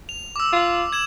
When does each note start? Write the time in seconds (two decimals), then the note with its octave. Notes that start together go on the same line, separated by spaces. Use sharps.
0.09 F7
0.36 D6 E6
0.52 F4
0.92 G#6 E7 F#7